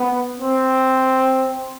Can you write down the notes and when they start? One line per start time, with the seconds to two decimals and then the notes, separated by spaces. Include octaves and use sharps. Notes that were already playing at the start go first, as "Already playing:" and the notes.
Already playing: B3
0.39 C4